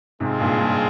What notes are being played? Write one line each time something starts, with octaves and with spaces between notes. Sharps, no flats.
G#2 C3 G#3 C4 F4 G#4
G2 A#2
G2 A#2